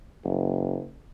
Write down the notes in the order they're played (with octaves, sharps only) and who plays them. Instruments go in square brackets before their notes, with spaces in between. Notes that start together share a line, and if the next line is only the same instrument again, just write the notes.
[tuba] F#1